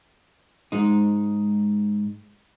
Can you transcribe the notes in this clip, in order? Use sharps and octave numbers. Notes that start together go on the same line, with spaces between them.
G#2 G#3 D#4